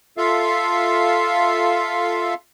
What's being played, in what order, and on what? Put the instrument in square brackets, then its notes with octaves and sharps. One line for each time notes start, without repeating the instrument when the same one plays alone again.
[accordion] F4 A4 E5 F5